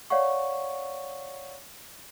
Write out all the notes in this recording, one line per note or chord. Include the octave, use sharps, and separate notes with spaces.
C#5 D5 F5 F#5 C#6